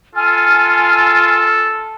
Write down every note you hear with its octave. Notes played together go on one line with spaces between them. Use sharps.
F4 A4 G#5 F6